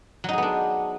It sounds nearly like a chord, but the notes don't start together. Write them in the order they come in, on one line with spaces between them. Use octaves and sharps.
F#3 D#4 G#4 B3 D4